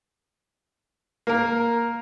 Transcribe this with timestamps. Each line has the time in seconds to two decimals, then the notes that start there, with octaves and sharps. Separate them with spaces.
1.27 A#3 A#4